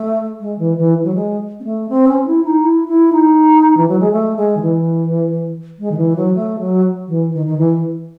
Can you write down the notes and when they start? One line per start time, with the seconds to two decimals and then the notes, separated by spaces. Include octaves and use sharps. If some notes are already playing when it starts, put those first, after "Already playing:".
Already playing: A3
0.41 G#3
0.59 E3
0.78 E3
1.04 F#3
1.15 G#3
1.60 C4
1.64 A3
1.89 C4
2.08 C#4
2.26 E4
2.44 D#4
2.63 E4
2.88 E4
3.12 D#4
3.77 E3
3.88 F#3
4.00 G#3
4.12 A3
4.36 G#3
4.57 D#3
4.61 E3
5.79 G#3
5.91 D#3
5.97 E3
6.16 F#3
6.34 A3
6.59 F#3
7.08 E3
7.34 D#3
7.46 D#3
7.58 E3